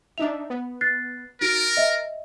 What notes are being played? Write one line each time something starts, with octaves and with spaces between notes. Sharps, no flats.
D4 D#4 E5 F7
B3
F#6 A6 C7
D#4 F#4 A#4 A6 D7
D#5 E5